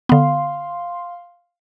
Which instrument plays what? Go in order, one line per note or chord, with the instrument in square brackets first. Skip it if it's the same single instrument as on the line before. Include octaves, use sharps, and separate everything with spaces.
[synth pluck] D3 B3 [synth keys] F5 C6